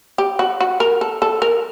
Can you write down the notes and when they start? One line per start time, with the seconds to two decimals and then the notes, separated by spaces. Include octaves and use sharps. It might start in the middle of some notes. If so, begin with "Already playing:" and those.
0.18 G4
0.39 F#4
0.60 F#4
0.80 A#4
1.01 A4
1.22 A4
1.42 A#4